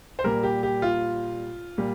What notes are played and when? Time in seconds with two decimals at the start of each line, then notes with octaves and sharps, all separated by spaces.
0.19 C5
0.24 A#2 G3 A#4
0.43 G4
0.63 G4
0.82 F4
1.78 A#2 G3